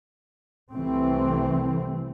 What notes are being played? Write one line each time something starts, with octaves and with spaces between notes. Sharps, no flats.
C2 E3 A3 C4